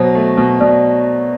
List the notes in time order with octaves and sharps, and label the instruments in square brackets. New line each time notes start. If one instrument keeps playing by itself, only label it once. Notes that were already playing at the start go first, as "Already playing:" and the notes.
Already playing: [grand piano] B2 F#3 [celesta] C5
[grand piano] A3
B2
[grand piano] B2 [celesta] D5